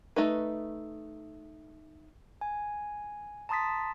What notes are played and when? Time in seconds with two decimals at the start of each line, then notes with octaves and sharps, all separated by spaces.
0.16 A3 D#4 B4
2.41 G#5
3.49 A5 A#5 C6 D#6 A6 B6